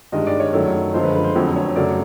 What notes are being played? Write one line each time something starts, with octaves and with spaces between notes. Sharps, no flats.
G2 D#3 G#3 D#5
D5
C#5
F#2 D#3 F#3 A3
F#2 D3 F3 G#3 C5
B4
B4
C5
F2 D3 F#3 A3
C#5
F#2 C#3 F#3 A3 D5